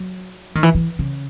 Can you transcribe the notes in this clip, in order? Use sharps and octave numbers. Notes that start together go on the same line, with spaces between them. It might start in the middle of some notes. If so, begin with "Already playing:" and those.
Already playing: F#3
D#3
E3
E3
C#3